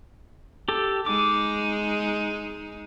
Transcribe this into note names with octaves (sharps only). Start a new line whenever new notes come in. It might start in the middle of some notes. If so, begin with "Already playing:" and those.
G4 A4
G#3 D#4 D6